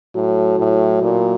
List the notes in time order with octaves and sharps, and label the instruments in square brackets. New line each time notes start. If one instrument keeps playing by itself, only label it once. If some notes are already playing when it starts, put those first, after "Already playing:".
[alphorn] A2 [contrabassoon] F#3
[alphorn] A2
A#2